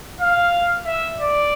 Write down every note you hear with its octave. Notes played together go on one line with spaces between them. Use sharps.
F5
E5
D5